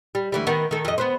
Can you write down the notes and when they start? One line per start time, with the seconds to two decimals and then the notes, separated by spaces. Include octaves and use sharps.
0.15 G3
0.32 D2 E3 G3
0.47 D#3 B3
0.71 D#3 A4
0.85 F2 D#5
0.98 B3 B4 C5